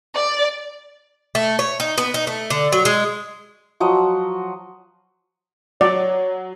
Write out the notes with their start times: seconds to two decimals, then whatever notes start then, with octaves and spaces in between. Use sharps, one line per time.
0.15 D5
1.35 A3
1.59 C#5
1.80 D#4
1.98 B3
2.14 D#4
2.27 A3
2.50 D3
2.72 F#3
2.85 G#3
3.80 F3 F#3 D#5 A#5
5.81 F#3 C#5 D5